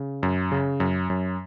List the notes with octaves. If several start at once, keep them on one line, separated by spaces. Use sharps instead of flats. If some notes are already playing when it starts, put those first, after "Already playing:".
Already playing: C#3
F#2
C#3
F#2
F#2